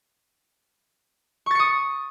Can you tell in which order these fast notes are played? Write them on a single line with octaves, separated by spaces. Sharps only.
C#6 A6 C#7 D#6